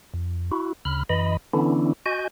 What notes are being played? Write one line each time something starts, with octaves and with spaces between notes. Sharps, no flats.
F2
E4 F#4
D2 C#3 B5 F6
F#2 E3 D#5 B5
D3 E3 B3 C#4 D4 E4
F#4 D#5 G#5 G6